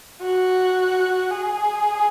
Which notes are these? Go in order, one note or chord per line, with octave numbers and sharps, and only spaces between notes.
F#4
G#4